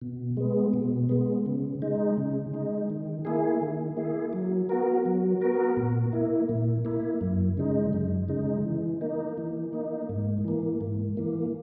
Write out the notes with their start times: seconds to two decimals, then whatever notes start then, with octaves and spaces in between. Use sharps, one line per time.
0.01 B2
0.37 G#3 B3
0.74 B2
1.09 G#3 B3
1.46 C#3
1.82 G#3 D#4
2.18 C#3
2.53 G#3 D#4
2.90 D#3
3.25 A#3 E4 G#4
3.61 D#3
3.97 A#3 E4 G#4
4.33 F#3
4.69 B3 F#4 A#4
5.06 F#3
5.41 B3 F#4 A#4
5.77 A#2
6.13 A#3 E4
6.49 A#2
6.85 A#3 E4
7.21 F#2
7.57 C#3 G#3 D#4
7.93 F#2
8.28 C#3 G#3 D#4
8.65 E3
9.01 A#3 D#4
9.38 E3
9.73 A#3 D#4
10.09 G#2
10.45 E3 A#3
10.81 G#2
11.17 E3 A#3